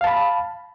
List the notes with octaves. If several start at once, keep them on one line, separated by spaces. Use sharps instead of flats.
F5 A5 B5